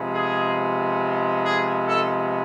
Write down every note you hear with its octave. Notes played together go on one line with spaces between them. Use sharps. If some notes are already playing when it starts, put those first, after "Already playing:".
Already playing: C3 F3 G#3 B3
G#4
G#4
A4